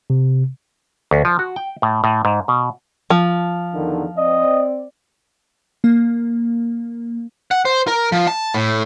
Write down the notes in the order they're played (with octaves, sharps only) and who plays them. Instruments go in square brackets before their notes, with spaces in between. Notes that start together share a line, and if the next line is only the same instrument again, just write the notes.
[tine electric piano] C3
[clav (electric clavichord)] D2
F3
F#4
G5
A2
A2
G#2
B2
[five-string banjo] F3
[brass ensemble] E2 D3 D#3
[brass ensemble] C4 D5 [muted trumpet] D#5
[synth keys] A#3
[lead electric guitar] F#5
C5
A#4
F3
A5
A2